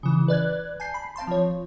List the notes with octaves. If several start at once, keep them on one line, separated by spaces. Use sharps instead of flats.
C#3 E3
B4 D5 F#6 G#6
G#5 A5 G6 C7
B5
C4 F5 A5 C6
F3 C#5